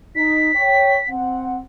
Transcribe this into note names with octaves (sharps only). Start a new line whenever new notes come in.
D#4 B6
C#5 G5
C4 F#5